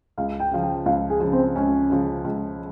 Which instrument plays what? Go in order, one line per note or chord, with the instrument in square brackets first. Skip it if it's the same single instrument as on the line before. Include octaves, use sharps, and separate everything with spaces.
[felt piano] C#2 [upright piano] F5
[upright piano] G5
[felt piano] C#3 F3 [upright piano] F5
[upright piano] G5
[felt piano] C#2 [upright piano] F5
[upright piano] G#4
[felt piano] C#3 F3
[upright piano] C4
[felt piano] C#2 [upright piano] C#4
[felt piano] C#3 F3
C#2